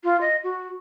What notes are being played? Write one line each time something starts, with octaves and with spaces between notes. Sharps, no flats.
F4
D#5
F#4